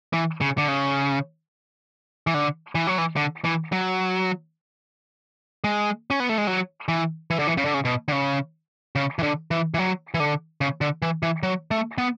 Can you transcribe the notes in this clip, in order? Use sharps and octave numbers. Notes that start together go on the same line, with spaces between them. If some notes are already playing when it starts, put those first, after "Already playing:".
E3
C#3
D3
C#3
E3
D3
E3
F#3
E3
D3
E3
F#3
G#3
C#4
B3
A3
G#3
F#3
E3
E3
D3
E3
C#3
D3
C#3
B2
D3
C#3
C#3
E3
D3
E3
E3
F#3
E3
D3
C#3
D3
E3
E3
F#3
A3
B3